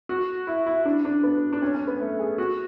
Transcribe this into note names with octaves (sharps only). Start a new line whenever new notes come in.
F#4
E4
E4
D4
D4
B3
D4
C#4
C#4
B3
A3
G#4
F#4